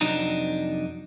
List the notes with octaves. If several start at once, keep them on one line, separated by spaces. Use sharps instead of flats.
F2 C3 F#3 D4 D#4 A#5